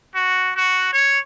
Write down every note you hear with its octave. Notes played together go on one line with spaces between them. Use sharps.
F#4
F#4
C#5